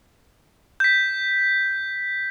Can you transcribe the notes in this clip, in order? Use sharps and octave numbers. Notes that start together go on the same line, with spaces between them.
G6 B6